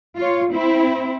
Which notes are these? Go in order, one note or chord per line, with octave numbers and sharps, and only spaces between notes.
F4 C#5
C4 E4